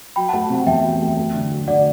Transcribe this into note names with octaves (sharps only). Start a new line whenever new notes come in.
F#3 G5 B5
F#5 A5
A3
C3 F#5 A5
E2 E5 G5
F#3
A3
A3
D3
F#3
D3 D5 F#5